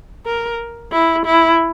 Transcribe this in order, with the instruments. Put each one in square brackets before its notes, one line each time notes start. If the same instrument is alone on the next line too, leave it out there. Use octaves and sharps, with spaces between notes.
[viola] A#4
E4
E4